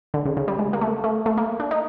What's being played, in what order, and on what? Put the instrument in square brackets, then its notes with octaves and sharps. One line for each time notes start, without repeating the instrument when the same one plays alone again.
[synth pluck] D3
C#3
C#3
G3
G#3
A#3
A3
A3
A3
A#3
D4
D#4